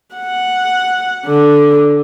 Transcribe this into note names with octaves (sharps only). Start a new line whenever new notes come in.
F#5
D3